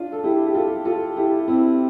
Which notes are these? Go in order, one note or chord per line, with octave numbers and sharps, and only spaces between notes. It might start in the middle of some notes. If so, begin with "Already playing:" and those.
Already playing: D4 F4
A4
E4 G4
G4
F4 A4
F4 A4
E4 G4
C4 E4